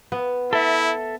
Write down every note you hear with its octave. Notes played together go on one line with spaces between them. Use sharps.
B3
E4 A4 E5